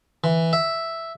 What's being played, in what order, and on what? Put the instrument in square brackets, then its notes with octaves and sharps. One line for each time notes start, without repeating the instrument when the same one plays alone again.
[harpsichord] E3
E5